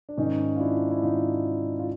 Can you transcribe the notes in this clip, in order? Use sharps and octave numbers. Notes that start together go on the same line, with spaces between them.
D4
G#2 D#3 C#4 D#4
F4
D4 E4
E4
G#2 D#3 D#4 F4
F4